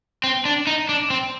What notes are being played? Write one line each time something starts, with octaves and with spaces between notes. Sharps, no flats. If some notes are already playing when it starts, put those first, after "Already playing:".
C4
D4
D#4
D4
C4